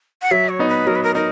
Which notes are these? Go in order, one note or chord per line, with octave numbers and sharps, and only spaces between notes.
F#5
F#3 E5
C#5
B3 D#4
B4
F#3 A#4
B4
A#4
D#4 A#4